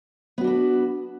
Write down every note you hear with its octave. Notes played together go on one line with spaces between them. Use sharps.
B3 D4 F#4 B4